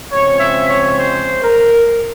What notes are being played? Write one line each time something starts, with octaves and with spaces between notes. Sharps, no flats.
C#3 F3 G#3 C4 C#5
E5
C#5
C5
A#4